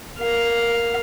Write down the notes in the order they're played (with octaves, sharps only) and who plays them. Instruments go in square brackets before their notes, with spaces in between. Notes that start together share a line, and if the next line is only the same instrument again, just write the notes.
[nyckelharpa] A#4 F5